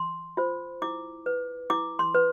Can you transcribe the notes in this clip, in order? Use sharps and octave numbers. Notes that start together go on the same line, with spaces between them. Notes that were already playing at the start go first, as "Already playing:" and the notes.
Already playing: C6
F4 C5
E4 D6
B4
E4 D6
C6
B4